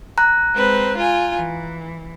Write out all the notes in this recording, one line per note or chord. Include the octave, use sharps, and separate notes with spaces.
A#5 F#6
G#3 C4 B4
F4 G#5
E3